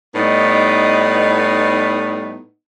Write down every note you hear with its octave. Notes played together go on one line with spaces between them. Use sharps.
A2 G3 B3 D#4